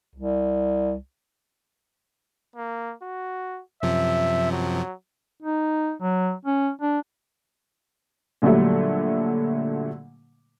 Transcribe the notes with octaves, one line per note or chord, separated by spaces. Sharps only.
C2
A#3
F#4
F#2 C3 F3 E5
F#3
D#4
F#3
C#4
D4
A#2 D3 F#3 G3 A3